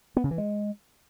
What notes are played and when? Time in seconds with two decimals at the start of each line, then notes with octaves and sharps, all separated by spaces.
0.17 B3
0.24 C#3
0.31 E3
0.38 G#3